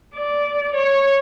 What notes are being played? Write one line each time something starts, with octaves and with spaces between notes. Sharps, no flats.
D5
C#5